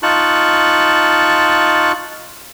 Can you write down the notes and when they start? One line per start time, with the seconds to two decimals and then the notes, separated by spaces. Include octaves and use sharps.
0.03 D#4 F4 A5 C#6 F#6